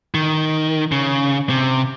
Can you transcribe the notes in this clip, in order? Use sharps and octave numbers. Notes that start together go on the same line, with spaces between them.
D#3
C#3
C3